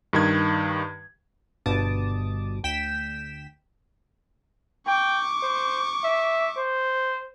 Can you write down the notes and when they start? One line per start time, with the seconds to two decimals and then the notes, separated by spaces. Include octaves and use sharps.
0.13 G2 D#3 G#6
1.66 G1 G2 B2 A5 D6 D#6
2.63 D2 G5 B6 E7
4.87 G5 C#6 D6
5.43 C5
6.04 E5
6.57 C5